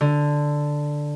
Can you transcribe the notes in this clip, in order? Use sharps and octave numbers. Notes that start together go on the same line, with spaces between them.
D3